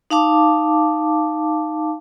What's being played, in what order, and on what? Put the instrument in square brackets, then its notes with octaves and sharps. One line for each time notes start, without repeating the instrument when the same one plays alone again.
[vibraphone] D#4 F5 A5 D6